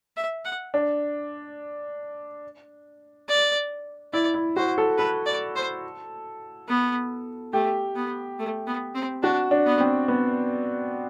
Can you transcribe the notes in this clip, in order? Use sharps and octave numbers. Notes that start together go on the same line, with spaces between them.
E5
F#5
D4
D5
E4 D5
E4
F#4 C5
A4
A4 B4
D5
C5
B3
A3 G4
B3
A3
B3
C4
D4 F#4
D4
B3
C4
B3